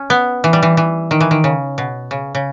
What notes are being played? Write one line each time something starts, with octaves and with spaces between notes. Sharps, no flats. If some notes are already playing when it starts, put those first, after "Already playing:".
Already playing: C#4
B3
E3
G3
E3
E3
D#3
E3
D#3
C#3
B2
C#3
C#3